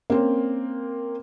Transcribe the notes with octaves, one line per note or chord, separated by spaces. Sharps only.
A#3 C4 C#4